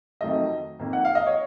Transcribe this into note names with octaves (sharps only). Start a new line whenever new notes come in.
F2 D#3 F#3 A3 D#5
F2 D#3 A#3
F#5
F5
D#5
C#5